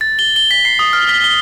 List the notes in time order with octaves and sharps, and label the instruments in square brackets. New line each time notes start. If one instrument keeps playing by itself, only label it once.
[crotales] A6
G7
G7
B6
C7
D#6
F6
B6
G7